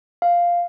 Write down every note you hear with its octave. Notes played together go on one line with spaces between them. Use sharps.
F5